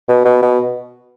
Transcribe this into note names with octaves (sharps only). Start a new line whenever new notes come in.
B2
B2
B2